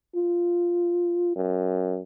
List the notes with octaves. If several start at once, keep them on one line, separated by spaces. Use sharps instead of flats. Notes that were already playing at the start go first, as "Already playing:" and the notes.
F4
F#2